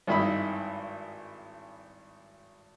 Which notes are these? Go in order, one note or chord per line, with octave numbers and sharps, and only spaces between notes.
G#1 G2 D#3 E4 D#5 B5